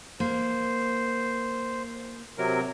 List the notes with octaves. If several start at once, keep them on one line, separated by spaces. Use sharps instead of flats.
A#3 C5
C3 F#3 A#4